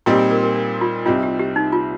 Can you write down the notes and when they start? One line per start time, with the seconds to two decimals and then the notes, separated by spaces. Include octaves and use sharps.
0.06 A#2 G3 C4 D#4 F4
0.13 G4
0.18 G#4
0.31 A#4
0.43 A#4
0.56 A#4
0.81 F4
1.05 C2 C3 G3 C4 D#4 F4
1.23 G4
1.39 G4
1.56 D#4
1.72 F4